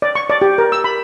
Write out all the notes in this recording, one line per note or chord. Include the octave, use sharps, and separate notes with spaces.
D5
C#6
D5
G4
A#4
E6
B5